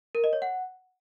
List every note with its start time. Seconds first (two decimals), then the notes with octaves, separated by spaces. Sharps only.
0.15 A#4
0.24 D#5
0.33 C#5
0.42 F#5